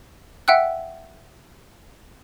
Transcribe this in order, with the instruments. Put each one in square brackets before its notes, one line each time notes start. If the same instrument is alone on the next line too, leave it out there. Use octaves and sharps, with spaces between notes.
[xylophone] E5 F#5 G5 E6 F#6